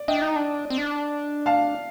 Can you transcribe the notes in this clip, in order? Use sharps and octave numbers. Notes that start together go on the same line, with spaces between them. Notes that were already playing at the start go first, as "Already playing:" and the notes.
Already playing: D5
D4 D#5 G5
D#4
D4
C4
D4
F5 A5